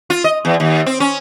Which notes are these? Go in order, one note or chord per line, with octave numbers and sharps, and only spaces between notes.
F4
D#5
E2
D#2
C4
C#4